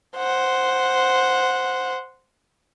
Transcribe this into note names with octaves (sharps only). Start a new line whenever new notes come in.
C5 F#5